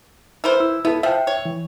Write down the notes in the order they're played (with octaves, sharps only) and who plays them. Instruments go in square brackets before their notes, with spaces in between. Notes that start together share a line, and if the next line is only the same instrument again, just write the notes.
[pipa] E3 A#4 C5
[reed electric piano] E4 E6
[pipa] B3 [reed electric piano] E4 A4
[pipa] F3 [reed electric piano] E5 G5
[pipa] C#5
[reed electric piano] E3